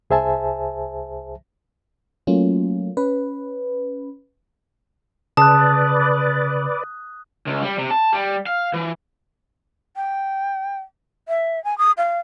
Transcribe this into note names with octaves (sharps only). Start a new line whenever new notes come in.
C2 G#4 C5 E5 G#5 A5
F#3 A3 A#3 C#4 F4
C#4 B4
C#3 B4 D5 A5 D#6 F#6
C#2
G3
C3
A5
G3
F5
E3
G5
E5
G#5
D#6
F5